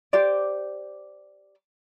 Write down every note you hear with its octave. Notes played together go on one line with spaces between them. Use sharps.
G4 C5 D5